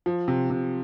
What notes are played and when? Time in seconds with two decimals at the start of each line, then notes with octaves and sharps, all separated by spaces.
0.06 F3
0.28 C3
0.50 C3